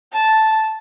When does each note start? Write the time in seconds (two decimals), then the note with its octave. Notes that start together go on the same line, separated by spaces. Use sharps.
0.12 A5